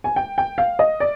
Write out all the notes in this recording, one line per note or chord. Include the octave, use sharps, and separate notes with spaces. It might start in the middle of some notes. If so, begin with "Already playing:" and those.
G#5
G5
G5
F5
D#5
D5